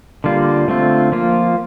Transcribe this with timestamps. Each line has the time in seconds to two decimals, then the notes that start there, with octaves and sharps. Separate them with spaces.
0.24 D3 G3 A#3 F4
0.68 D3 A3 C4 F4
1.12 F3 A#3 F4